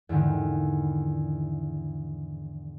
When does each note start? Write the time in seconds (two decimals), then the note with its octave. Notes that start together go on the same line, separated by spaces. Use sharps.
0.09 E2 G#2 D3 D#3